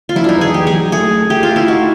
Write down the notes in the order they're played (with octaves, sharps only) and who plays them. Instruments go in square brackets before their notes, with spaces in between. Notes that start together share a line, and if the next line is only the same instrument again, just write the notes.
[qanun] F4
[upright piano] F#3 [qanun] E4
[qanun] D4 D#4
[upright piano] E2
[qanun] G#4
[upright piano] E2 [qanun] G4
[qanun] G#4
[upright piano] F#3
[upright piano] A3 [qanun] G#4
[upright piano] A3
[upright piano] A3 [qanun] G4
[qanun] F4
[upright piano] A3
[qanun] E4
[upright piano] D#4 [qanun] F#4